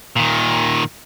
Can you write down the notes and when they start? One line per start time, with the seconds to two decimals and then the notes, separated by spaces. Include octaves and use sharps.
0.16 A#2 D#3